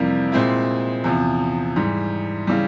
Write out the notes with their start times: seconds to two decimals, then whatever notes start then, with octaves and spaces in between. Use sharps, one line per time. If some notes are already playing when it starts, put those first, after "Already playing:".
Already playing: F2 C3 E3 G3 A#3
0.32 A#2 G#3 C4 E4
1.04 E2 C3 F3
1.76 G#2 E3 G3
2.47 C#3 E3 G3